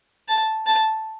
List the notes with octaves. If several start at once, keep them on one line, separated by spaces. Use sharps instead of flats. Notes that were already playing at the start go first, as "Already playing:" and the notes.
A5
A5